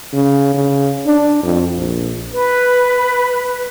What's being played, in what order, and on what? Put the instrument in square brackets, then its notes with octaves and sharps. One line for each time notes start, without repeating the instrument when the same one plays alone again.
[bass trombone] C#3
C#3
D4
F2
A#1
[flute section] B4